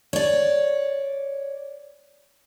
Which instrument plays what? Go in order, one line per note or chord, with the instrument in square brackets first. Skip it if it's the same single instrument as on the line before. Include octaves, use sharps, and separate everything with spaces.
[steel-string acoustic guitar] C#5 D5